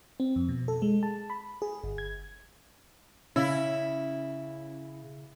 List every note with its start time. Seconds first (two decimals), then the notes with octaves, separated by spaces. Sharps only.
0.20 C4
0.36 F2
0.49 B2
0.68 A4
0.82 G#3
1.03 A5
1.30 B5
1.62 G#4
1.84 G1
1.98 G#6
3.36 C#3 C#4 E4